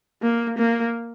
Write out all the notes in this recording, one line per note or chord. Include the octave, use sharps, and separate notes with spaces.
A#3
A#3